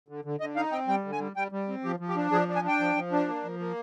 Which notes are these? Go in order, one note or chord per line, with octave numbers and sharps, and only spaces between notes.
D3
D3
D3 D#5
D#4 F5
C4 G5
G3 G5
D3
G#5
G3
G3 G5
G3
C4
F3 G4
F3
G4
D4
F3 G#4
D4
G#5
D4 G5
F3
F3
D4
A#3
F3
A#3